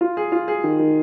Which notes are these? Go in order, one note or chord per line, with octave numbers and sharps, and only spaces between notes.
F4
G#4
F4
G#4
D#3
D#3